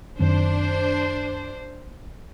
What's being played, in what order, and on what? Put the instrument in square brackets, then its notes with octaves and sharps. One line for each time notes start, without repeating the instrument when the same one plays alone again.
[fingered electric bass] F#2 D#3 C4 [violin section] D4 C5